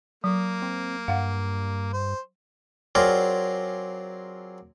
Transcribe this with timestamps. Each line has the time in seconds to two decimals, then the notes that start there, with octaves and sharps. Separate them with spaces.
0.24 F#3 A#3
0.62 C4
1.08 G2 F5 F#5
1.93 C5
2.95 F#3 C4 F4 G#4 A#4 D5